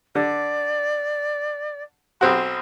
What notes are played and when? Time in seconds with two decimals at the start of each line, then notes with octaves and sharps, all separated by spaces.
0.15 D3 D5
2.21 B1 C4 F#4 C6